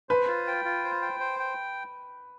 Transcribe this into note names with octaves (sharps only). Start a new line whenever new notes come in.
B4 C5
F4
G5
F4
C5
G5
C5
G5